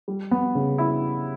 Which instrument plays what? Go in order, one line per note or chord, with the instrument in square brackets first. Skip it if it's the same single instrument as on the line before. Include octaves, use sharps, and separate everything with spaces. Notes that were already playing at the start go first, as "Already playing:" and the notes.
[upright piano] G3
B3
C#3
E4